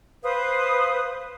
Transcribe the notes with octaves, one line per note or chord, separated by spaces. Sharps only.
B4 C5 F5 D#6